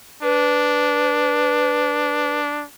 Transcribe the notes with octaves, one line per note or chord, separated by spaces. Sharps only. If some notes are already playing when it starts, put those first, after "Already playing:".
D4 B4